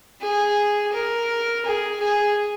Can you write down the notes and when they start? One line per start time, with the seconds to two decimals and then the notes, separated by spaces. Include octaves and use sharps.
0.22 G#4
0.93 A#4
1.65 G#4
2.00 G#4